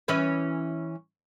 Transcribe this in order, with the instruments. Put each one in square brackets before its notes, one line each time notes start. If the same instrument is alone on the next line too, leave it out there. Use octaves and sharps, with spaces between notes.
[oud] E3 C#4 B4